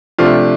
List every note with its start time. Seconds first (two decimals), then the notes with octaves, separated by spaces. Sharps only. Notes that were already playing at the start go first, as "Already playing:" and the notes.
0.18 C3 F3 A3 D4 F4